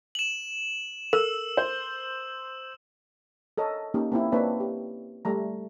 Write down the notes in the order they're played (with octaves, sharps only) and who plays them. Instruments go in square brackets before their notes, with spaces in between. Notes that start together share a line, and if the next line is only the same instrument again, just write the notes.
[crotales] E7 F#7
[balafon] A4 [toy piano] A#4 [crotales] E6
[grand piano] C5
[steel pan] A4 A#4 C#5 D#5
A#3 C#4 D#4 G4
A#3 C4 E4
A#3 C4 D4 B4 C#5 E5
G4
G3 A3 A#5